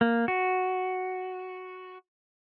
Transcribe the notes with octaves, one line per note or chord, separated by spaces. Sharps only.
A#3
F#4